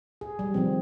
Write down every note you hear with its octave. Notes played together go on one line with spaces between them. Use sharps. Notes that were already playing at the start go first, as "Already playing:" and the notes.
G#4
G3
D#3 F3 C4